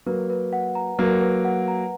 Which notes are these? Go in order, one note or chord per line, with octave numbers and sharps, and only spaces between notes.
F#3 A#3 B4
B4
F#5
A#5
F#3 A#3 B4
B4
F#5
A#5